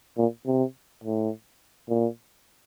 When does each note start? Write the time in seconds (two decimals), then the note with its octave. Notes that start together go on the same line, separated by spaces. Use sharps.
0.18 A#2
0.46 C3
1.04 A2
1.89 A#2